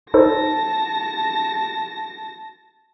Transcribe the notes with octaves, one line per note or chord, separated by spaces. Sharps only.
D#4 A4 C5 A5 A#6